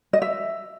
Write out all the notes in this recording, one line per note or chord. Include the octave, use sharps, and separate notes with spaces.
D#5
E5